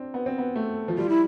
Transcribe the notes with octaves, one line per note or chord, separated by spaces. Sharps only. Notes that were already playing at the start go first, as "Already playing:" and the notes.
Already playing: C4 D4
B3
C4
B3
A3
F3
G3 F4
E4